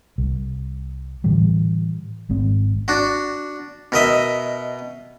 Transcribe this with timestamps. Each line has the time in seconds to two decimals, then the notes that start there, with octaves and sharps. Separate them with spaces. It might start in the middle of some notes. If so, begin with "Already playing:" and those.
0.18 C2
1.24 A2 D3 E3 G3
2.29 G#1 G#2 C4
2.88 D4 F#4
3.92 B2 A#4 D#5 E5